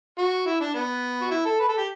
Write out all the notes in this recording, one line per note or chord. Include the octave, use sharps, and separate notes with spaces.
F#4
E4
D4
B3
F#4
E4
A4
B4
A4
G4